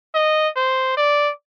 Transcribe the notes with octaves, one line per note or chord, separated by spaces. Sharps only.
D#5
C5
D5